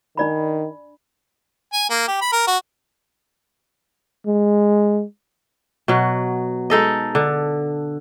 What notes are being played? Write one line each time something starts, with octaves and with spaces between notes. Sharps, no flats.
D#3 D4 D5 B5
G#5
A#3
G4
B5
A#4
F#4
G#3
B2 F#3
G#3 D#4 A4 D#5
D3